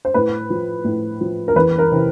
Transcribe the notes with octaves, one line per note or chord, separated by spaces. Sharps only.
C5
A2 B4
F3
A2
F3
A#4
E2 B4
A#4
C3 E3